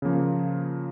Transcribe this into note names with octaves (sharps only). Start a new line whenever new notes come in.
C#3 F3 A#3